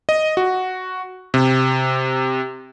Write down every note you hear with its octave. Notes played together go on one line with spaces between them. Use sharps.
D#5
F#4
C3